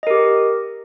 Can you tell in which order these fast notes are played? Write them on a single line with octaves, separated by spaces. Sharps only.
D#5 A#4 G4